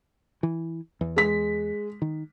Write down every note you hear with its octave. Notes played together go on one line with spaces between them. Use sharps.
E3
E2
G#3 B6
D#3